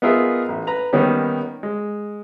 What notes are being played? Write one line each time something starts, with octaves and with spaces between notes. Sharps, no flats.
B3 D#4 F4 G#4 A#4 E5
A1
B4 A#5
D#3 G3 A#3 B3 C#4
G#3